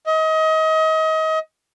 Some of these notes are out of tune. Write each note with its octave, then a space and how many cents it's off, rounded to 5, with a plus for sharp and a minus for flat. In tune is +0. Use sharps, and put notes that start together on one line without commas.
D#5 +30